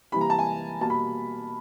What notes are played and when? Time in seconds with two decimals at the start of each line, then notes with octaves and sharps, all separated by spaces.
0.12 C3 E3 G3 A#3 B5
0.21 A#5
0.30 A5
0.39 G#5
0.81 B2 G3 A#3 A5
0.90 B5